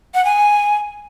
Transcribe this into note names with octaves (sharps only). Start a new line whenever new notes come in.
F#5
G#5